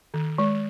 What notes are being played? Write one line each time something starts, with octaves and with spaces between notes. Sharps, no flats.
D#3
G#3